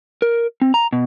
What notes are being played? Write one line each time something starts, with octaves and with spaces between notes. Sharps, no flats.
A#4
C4
A#5
B2